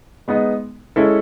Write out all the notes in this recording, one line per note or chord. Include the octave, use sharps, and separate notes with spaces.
G#3 B3 D#4
G#3 C#4 E4 A4